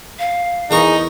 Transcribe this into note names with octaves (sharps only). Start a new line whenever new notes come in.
F5
E2 D#4 G#4 A#4 C#6